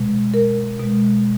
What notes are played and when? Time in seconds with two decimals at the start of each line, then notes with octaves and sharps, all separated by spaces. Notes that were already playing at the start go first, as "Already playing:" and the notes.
Already playing: B2 G#3
0.34 A#4
0.80 B2 G#3